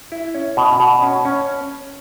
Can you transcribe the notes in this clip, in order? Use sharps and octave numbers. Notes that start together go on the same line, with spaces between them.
E4
C#4
B2
B2
C#4
C#4